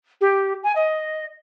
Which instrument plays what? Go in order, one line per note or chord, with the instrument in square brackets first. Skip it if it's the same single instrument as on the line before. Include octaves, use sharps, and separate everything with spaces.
[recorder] G4
G#5
D#5